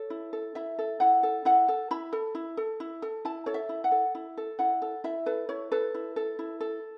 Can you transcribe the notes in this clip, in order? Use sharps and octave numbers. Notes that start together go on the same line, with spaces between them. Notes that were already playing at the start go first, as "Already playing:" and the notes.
Already playing: A4 C#5
E4
A4
E4 E5
A4
E4 F#5
A4
E4 F#5
A4
E4 B5
A4
E4
A4
E4
A4
E4 A5
A4 C#5
E5
E4
F#5
A4
E4
A4
E4 F#5
A4
E4 E5
A4 B4
E4 C#5
A4 B4
E4
A4
E4
A4